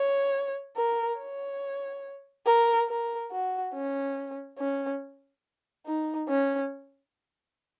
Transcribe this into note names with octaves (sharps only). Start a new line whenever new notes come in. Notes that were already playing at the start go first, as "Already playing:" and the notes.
Already playing: C#5
A#4
C#5
A#4
A#4
F#4
C#4
C#4
D#4
C#4